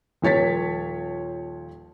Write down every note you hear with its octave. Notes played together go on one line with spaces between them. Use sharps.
D#1 F3 C#5 A6 B6